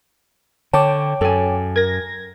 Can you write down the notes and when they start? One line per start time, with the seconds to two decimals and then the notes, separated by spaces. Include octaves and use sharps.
0.73 D3 C#5 G5 A5 D6
1.21 F#2 A4 G#5
1.76 A#4 G#6 A#6